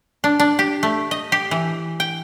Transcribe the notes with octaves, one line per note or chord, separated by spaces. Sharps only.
D4
D4
G4
A3
D#5
G4
E3
G5